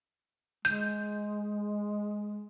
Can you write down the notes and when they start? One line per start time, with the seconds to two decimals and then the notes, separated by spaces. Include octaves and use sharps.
0.65 G#3 G6